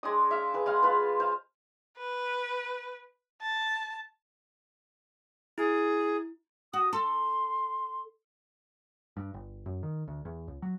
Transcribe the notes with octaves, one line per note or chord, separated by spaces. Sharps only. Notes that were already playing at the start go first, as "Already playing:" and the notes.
G#3 D4 D#6
E5 F5 E6
G#4 B4
G#3 F5 F#5
F4 B4
C5 F5
B4
A5
E4 G#4
F#4 D#6
A4 C6
G2
G1
F#2
D#3
D2
E2
C#2
F#3